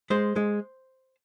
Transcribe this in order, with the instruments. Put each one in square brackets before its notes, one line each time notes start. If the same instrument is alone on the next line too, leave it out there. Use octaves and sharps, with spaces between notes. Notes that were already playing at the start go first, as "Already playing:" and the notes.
[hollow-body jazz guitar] G#3 C5
G#3